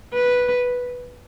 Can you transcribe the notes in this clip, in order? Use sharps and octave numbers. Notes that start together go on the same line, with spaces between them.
B4